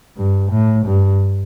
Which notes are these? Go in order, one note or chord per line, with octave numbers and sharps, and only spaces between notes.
G2
A2
G2